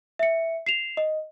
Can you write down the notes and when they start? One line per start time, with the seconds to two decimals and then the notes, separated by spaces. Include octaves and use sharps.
0.19 E5 C#7
0.66 C7 E7 F7
0.97 D#5